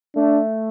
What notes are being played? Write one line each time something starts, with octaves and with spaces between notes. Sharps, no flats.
A3 D4